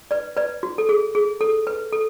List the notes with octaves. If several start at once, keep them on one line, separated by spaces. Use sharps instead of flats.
B4 D5
B4 D5
F#4
A4
G#4
G#4
A4
B4
A4